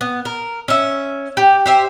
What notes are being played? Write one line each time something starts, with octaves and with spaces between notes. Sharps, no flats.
B3
A#4
C#4 E5
G4
G4 C5 E5